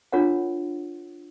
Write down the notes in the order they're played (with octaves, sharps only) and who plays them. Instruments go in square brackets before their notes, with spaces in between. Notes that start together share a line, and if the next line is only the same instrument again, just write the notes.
[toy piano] D4 F4 A#4 C#5 F#5